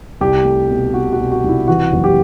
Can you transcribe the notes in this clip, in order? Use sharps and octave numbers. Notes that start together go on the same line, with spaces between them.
C2 G4
A3
B2
B2 F#4
F#4
B2
F#4
C2 E4
E3 F#4
F#1
G4